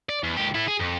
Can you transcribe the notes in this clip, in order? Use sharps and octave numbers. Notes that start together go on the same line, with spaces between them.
D5
E2
C#2 G4
E4 A4
G#4
F2